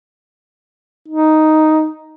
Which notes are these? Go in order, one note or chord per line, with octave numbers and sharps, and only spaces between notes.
D#4